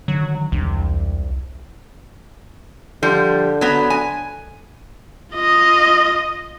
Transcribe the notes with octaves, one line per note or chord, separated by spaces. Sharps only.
D3 D#3 F#3
E1 C2 C#4 D4
D3 F3 G3
F#3 B3
G#5
F4 D#5